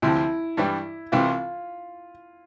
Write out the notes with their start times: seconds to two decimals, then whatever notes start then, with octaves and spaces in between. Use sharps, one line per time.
0.02 D2 C3 F3 E4
0.57 G2 E3 G3
1.12 C2 C3 E3 F4